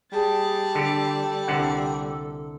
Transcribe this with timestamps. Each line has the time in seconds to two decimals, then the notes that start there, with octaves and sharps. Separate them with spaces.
0.13 G3 G#4 A5
0.75 D3 G4 A4
1.48 C2 D3 F#5